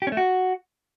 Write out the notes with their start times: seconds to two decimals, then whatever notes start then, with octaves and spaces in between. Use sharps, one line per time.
0.02 G4
0.07 C#4
0.12 A3
0.17 F#4